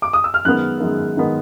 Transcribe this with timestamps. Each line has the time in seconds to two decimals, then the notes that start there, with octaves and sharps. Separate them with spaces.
0.02 D6
0.13 D#6
0.24 E6
0.34 F6
0.45 F#2 D#3 G#3 B3 F#6
0.80 F#2 D#3 G#3 B3
1.17 D#3 G#3 B3